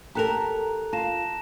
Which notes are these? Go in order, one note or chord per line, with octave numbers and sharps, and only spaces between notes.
G4 A4 A#4 A#5 F#6 F7
F4 A5 A#6 E7